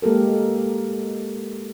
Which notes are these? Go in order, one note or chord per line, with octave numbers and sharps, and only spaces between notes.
G#3 A#3 G4 A4 A#4